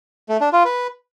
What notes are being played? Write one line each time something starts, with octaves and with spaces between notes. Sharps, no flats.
A3
D4
F4
B4